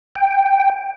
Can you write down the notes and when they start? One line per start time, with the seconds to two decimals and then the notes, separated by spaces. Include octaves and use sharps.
0.16 G5